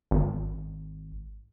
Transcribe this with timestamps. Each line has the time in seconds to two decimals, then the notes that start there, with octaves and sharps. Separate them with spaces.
0.11 G#1